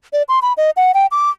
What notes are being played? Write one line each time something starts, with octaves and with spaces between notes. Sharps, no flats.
D5
C6
B5
D#5
F#5
G5
D6